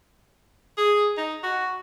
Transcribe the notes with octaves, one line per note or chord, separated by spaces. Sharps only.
G#4
D#4
F#4